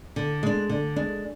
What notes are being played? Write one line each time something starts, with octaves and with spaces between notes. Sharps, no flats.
D3
G#3 D4
D3
G#3 D4